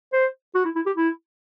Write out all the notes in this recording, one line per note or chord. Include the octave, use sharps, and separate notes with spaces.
C5
F#4
E4
E4
G4
E4